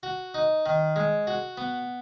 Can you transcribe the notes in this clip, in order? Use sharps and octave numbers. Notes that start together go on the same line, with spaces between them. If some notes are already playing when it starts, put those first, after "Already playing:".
F#4
D#4
D#3
G#3
F#4
B3